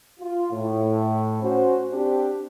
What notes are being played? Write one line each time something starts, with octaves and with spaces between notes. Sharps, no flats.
F4
A2
C#4 F#4 C5
C4 D4 G4